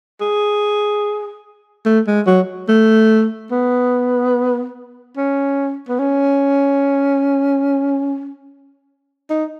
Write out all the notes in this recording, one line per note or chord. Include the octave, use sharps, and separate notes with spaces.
G#4
A3
G#3
F#3
A3
B3
C#4
B3
C#4
D#4